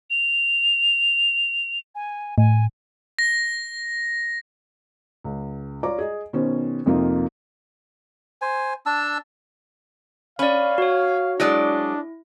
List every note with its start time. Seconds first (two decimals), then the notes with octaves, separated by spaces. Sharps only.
0.10 F7
1.95 G#5
2.38 A2 G#5
3.19 A#6
5.24 C#2
5.83 F4 C#5 D5 A#5 D6
5.98 G#4 D#5
6.33 B2 D#3 C#4 C5
6.86 F2 C3 A#3 D#4 F4
8.42 C5 G#5
8.86 D4 A5 E6
10.39 C#4 D5 F5 B5
10.78 F#4 C#5
11.40 F#3 G#3 D4 E4 D5